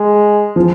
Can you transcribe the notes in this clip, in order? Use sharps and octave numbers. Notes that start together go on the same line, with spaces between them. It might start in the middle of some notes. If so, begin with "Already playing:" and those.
Already playing: G#3
F3